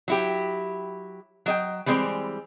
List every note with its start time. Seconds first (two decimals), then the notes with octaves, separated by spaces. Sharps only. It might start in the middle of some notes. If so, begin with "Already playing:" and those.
0.08 F#3 E4 G4
1.46 F#3 D#5 G5
1.86 E3 G3 G#3 C4 D5